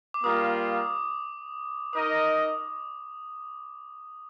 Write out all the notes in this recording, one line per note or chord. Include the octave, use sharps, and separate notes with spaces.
D6
G3 A#3 F4 A#4 F5 D#6
D#4 A#4 D#5 D#6